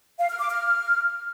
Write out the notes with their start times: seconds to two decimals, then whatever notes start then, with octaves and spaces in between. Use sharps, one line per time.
0.19 F5
0.29 F6
0.39 D6
0.50 F6